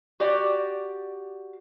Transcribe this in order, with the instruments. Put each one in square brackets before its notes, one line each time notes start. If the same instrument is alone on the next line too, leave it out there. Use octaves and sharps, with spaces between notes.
[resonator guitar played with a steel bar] F#4 G4 D5